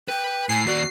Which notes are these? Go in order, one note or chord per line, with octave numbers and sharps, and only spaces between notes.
B4 G5
A2 G#5 C7
D#2 F#4 D5